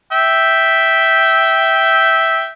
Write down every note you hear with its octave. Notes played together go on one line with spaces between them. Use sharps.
E5 G5